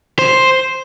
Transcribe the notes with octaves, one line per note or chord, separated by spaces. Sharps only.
C5